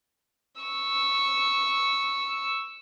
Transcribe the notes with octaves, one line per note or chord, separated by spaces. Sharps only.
C#6 E6